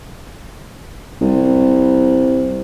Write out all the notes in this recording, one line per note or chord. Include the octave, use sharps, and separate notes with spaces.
C2